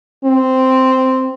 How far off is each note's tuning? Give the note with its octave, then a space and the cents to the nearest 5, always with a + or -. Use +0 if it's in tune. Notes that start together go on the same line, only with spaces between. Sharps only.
C4 -5